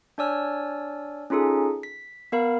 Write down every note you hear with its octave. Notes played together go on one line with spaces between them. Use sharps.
D4 C#5 D5 G#5 E6 F6
C#4 D#4 F4 G#4 A4
B6
B3 A#4 F5 B5